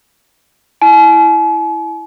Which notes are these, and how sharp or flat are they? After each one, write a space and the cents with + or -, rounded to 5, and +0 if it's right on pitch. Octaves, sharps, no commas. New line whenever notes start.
E4 +0 G#5 +45